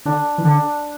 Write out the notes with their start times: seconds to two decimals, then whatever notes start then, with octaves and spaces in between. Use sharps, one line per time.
0.06 D3 D4
0.38 E3
0.44 D3 D4